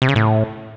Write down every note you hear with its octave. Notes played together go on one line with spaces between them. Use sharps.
C3
C#3
A2